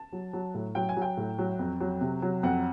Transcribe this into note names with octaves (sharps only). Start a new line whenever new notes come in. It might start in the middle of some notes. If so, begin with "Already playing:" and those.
Already playing: A5
F#3
F#3
A2
F#3 G5
G#5
F#3
G5
A2
F#3
F2
F#3
C3
F#3
F2 F#5